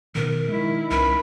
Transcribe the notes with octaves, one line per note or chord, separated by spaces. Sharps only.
B2 D#3 A#4
D#3 G#3 E4
C2 C#4 A#4 B5